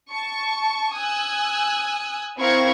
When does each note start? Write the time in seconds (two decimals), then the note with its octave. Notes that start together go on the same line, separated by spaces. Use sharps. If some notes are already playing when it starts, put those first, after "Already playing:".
0.10 A5 C#6
0.93 G#5 D#6 E6 F#6
2.38 C4 E4 A#4 F5 C#6 G#6